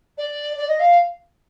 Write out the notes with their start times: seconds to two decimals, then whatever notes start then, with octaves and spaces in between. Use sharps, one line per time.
0.17 D5
0.57 D5
0.68 D#5
0.79 F5